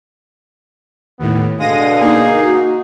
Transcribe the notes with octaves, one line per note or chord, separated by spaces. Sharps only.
D#2 A2 B3
B2 D3 G#3 F5 D#6 A#6 D#7
A#3 D#4 G#4
F#4